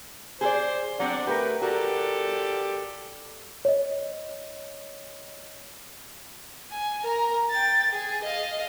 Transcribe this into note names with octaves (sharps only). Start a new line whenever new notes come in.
G#4 A4 C5 D5
F#3 C4 D4 D5 F#5
A3 G4 A#4 B4
F#4 G4 A4 A#4 D5
C#5 D#5
G#5
A#4 A#5
G5 A6
G#4
D#5 F5